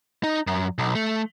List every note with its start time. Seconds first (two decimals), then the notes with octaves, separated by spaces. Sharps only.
0.24 D#4
0.47 F#2
0.78 B1
0.95 A3